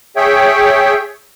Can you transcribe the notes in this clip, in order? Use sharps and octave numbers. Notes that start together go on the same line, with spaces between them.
G#4 C#5 E5 G5